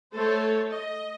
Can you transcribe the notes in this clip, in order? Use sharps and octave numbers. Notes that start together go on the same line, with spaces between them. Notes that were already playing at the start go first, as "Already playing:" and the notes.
A3 A4 C5 C#5
D#5